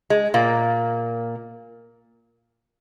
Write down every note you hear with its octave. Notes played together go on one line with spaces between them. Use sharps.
G#3
A#2 A#3